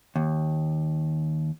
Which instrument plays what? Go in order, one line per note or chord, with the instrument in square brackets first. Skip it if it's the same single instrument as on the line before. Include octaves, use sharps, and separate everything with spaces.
[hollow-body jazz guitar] D#2